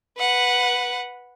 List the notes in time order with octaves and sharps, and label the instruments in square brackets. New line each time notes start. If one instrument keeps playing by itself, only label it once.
[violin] B4 F#5